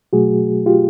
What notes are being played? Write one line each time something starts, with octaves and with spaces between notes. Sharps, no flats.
B2 F#3 A3 F#4 G#4
F4 G4